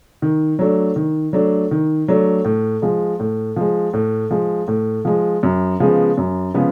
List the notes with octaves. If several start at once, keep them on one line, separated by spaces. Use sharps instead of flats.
D#3
F#3 A3 D4
D#3
F#3 A3 D4
D#3
F#3 A3 D4
A2
F3 G#3
A2
F3 G#3
A2
F3 G#3
A2
F3 G#3
F#2
C#3 F3 G#3 B3
F#2
C#3 F3 G#3 B3